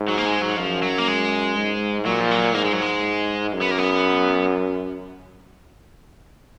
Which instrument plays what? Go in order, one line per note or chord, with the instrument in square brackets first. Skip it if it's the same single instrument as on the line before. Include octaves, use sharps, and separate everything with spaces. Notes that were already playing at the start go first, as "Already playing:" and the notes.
Already playing: [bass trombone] G#2
[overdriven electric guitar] F#3
A#3
G#3
F#3
[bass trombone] F#2 [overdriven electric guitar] F3
[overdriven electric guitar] F#3
A#3
G#3
[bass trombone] G#2
[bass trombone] A#2 [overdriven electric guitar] F#3
[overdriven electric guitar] F3
F#3
[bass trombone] G#2 [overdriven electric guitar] A#3
[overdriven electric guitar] G#3
F#3
G#3
[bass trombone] F#2
[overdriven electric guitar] B3
A#3
B3